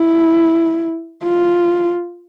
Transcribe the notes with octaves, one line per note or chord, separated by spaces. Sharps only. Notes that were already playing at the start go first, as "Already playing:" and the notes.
Already playing: E4
F4